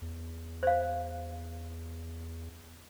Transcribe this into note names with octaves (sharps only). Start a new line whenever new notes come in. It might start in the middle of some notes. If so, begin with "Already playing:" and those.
E2
C5 F5